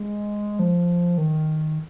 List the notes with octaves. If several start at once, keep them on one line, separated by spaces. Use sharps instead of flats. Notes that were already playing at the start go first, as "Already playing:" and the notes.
Already playing: G#3
F3
D#3